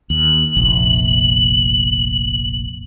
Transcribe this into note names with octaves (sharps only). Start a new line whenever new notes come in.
D#2 F#7
F1 A#1